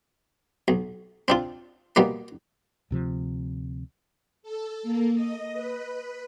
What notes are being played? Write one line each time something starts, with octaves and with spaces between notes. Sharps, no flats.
B1
C4 D4 F4
B2 G3 A#3
D2 C3 F3
A4
A#3
D#5
B4